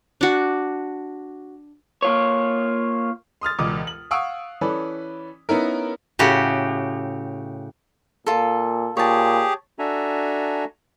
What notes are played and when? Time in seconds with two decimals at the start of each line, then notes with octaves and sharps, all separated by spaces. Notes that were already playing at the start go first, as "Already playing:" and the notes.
0.21 D4 F#4
2.02 A#3 F4 C#5
3.41 C6 D#6 F6 A6
3.59 E1 C#2 D6 D#6
3.87 F#7
4.11 F5 F#5 C#6 D#6 E6 D7
4.61 E3 C#4 A4 B4 D5
5.49 B3 C#4 D#4 E4 A#4
6.19 A2 C#3 F#4 G4
8.26 A#2 F4 A4
8.97 A#2 G4 G#4 C#5 A5
9.79 D4 F#4 A4 E5 G#5 A#5